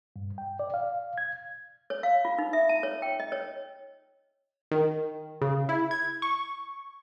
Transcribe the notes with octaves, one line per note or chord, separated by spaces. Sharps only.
G2
G5
D5
F5
G#6
C#5
F5
F4
D#4
E5
A5
C#5
G5
D#5
C#5
D#3
C#3
E4
G#6
C#6